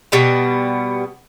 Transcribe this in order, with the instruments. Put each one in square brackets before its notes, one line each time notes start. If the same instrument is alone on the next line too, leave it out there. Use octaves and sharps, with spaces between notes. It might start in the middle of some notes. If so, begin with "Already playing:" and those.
[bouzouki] B2 G3 B3